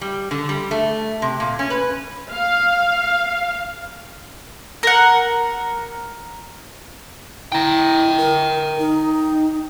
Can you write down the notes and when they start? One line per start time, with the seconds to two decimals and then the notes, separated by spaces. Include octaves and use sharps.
0.01 G3
0.31 D3
0.49 G3
0.71 A3
1.22 C3
1.40 A#2
1.59 C#4
1.70 B4
2.31 F5
4.83 A#4 F#5
7.52 E4 G5 A#5
8.18 A#4
8.79 D#4